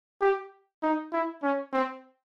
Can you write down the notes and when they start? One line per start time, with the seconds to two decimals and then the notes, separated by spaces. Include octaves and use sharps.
0.21 G4
0.83 D#4
1.13 E4
1.43 C#4
1.73 C4